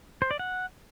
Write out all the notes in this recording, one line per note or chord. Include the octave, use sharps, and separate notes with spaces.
C5
D5
F#5